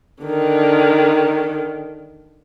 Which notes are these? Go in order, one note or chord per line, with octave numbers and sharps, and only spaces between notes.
D3 D#3